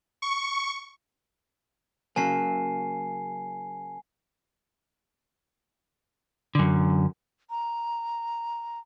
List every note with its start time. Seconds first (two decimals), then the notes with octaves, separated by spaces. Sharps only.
0.22 C#6
2.16 C#3 F#3 A#3 G#5 A5 C7
6.55 F#2 D3
7.50 A#5